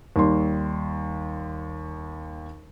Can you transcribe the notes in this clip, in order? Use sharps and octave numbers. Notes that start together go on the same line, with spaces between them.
D#2 G3 C6